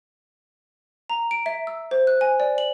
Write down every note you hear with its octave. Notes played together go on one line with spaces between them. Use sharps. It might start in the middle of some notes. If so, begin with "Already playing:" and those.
A#5
D7
E5
E6
C5
F#6
G#5
D5
F#7